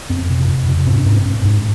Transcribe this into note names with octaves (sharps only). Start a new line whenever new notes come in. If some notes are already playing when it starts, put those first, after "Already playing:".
F2 C4
C3
F2
C3
G#2 C4
D4
G#2 C#4
C4
G#2 C#4
G#2